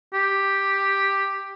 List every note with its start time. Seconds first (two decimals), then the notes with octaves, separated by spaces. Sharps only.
0.14 G4